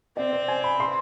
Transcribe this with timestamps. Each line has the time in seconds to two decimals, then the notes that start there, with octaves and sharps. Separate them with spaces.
0.17 C4 D5
0.33 C5
0.48 G#5
0.64 B5
0.80 C6